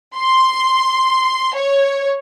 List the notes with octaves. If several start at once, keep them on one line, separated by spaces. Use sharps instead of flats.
C6
C#5